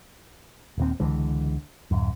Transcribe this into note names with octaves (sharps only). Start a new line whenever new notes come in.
D#1 D#2 C4
C#2 D3 E3 G#3
D1 F#2